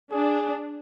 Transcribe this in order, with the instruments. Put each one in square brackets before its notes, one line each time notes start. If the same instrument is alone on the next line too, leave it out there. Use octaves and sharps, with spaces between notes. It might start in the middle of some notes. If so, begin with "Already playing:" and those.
[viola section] D4 [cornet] G#4